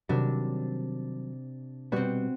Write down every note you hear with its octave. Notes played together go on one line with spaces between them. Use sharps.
C3 D#3 F#3 G3 D4
B2 G3 B3 C4 F#4